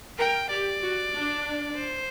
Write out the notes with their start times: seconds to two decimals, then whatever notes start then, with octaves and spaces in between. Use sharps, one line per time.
0.18 A#4 G5
0.50 G4 D5
0.82 F#4
1.13 D4
1.76 C5